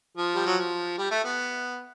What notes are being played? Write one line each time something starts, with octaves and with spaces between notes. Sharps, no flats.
F3
G3
F#3
F3
G3
A3
B3